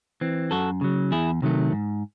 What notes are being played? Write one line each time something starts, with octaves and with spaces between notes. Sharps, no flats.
E3 C4
F#2 F#4 A4
C#3 F#3
E2 E4 G#4
C3 D#3 F#3 A3
G#2